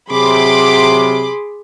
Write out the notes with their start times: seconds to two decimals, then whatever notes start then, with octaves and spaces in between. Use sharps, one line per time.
0.10 C3 F#3 G#4 B5 C6 D6